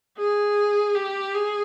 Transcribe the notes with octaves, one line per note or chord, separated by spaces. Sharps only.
G#4
G4
G#4